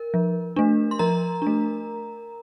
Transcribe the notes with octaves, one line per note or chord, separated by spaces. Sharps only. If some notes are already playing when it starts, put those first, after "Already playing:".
Already playing: A#4
F3
A3 D4
C6
F3 A#4 A#5
A3 D4